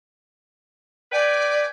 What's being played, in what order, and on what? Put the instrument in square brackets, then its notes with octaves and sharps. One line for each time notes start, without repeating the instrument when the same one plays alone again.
[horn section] B4 G5 G#5 [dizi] D5